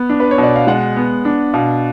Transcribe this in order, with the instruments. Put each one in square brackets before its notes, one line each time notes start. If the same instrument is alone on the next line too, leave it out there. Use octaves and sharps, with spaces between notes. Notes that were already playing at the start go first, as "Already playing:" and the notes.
Already playing: [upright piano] B3
D4
[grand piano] B4
C#5
[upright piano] B2
[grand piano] D5
F5
[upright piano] G#3 [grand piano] F#5
[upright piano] B3
D4
[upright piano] B2 [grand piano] F5